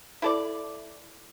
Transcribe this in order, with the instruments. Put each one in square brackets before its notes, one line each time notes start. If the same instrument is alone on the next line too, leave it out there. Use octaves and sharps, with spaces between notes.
[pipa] E4 A4 D5